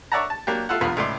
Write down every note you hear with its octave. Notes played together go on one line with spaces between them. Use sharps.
C#5 D5 E5 F#5 A5 A#5
A5
F#3 A#3 D4 G4
F4 A4 E5 F#5
B1 E2 B3 F4 B5
C#2 A2 D5 C6